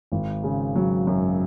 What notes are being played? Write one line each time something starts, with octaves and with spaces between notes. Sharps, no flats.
G#1
C#3
F#3
F#2